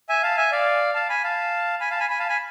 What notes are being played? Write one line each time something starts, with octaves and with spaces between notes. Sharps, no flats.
E5 G#5
F5 A5
E5 G#5
D5 F5
F5 A5
G#5 B5
F5 A5
G#5 B5
F5 A5
G#5 B5
G#5 B5
F5 A5
G#5 B5